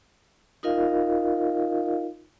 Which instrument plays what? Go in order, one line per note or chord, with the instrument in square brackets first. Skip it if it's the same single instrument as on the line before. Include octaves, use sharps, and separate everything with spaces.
[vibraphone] D#4 F4 A#4 D#5 F5